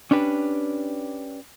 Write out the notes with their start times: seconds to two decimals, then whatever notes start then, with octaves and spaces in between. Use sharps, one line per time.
0.11 C#4 D4 G4 B4